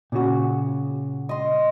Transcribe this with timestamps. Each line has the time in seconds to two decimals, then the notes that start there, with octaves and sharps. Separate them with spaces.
0.12 A#2 C#3 F#4
1.29 D#5 C6